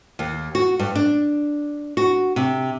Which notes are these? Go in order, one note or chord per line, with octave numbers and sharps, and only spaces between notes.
D#2
F#4
G2
D4
F#4
C3